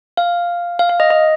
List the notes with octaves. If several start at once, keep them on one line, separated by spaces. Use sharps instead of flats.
F5
F5
F5
D#5
D#5